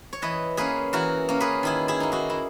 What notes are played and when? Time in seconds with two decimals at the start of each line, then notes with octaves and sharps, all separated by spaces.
0.13 C#5
0.22 E3 B4 D#5
0.57 A#3 C#4 G#4 B4
0.93 E3 F#4 A#4
1.29 A#3 C#4
1.40 G#4 B4
1.63 D#3 E4 G#4
1.88 E4 G#4
2.00 A#3 D#4
2.12 D#4 F#4
2.30 E4